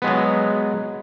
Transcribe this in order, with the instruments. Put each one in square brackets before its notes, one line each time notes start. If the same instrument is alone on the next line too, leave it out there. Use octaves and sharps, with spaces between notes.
[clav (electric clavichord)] F#3 G#3 B3